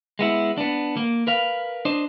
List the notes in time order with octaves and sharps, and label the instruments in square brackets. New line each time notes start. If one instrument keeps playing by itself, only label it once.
[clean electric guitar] G#3 B3 E4
B3 D4
A#3
A#4 B4 F5
D4 C5 D#5